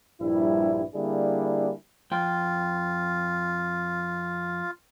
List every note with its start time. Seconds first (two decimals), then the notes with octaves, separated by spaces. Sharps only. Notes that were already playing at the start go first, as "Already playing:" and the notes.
0.21 A#1 G2 G3 E4
0.95 D3 G3 A#3 D4 E4 G#4
2.11 F2 F4 G5